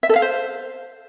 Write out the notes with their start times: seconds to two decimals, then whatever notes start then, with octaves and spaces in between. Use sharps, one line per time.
0.03 E5
0.09 A4
0.16 F5
0.22 C5